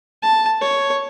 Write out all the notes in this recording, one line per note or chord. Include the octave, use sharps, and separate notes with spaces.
A5
C#5